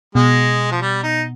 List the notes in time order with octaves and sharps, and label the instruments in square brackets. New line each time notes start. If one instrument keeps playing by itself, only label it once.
[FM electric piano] B2 [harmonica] G#3
[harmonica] F3
G3
D#4